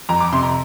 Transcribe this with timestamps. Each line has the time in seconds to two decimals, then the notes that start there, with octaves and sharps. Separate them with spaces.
0.09 F2 A#5
0.20 D6
0.32 C3 C6
0.43 A#5